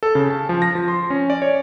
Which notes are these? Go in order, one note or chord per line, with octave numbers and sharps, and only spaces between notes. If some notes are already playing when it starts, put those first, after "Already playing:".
A4
C#3
A5
F3
A#6
F3
C6
C#4
D5
C#5